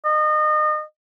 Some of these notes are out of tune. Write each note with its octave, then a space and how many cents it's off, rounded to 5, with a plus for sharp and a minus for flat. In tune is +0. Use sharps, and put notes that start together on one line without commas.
D#5 -30